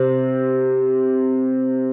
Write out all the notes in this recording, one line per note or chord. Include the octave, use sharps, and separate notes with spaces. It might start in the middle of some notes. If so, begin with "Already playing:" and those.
Already playing: C3 C4